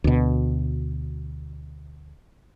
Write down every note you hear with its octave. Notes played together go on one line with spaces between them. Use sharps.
D2 B2